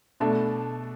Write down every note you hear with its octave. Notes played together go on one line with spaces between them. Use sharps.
B2 A3 D4 A5